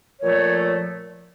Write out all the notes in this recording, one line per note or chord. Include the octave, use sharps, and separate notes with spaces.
A#2 F3 A3 C#5